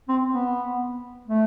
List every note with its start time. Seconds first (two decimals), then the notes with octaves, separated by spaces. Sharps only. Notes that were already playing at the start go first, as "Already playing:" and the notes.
0.09 C4
0.34 B3
1.27 A3